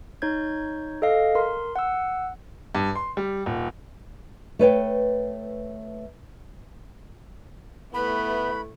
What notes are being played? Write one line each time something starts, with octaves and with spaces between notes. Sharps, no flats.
D#4 C#5 G6 G#6
A4 D#5 F5
A#4 C6
F#5 E6
G2
C6
G3
D#1
A3 B4 C#5 G5
A3 B3 E4 B4 B5